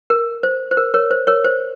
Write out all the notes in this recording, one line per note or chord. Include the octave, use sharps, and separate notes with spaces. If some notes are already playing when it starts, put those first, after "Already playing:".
A#4
C5
C5
A#4
A#4 C#5
C5
A#4 C#5
C5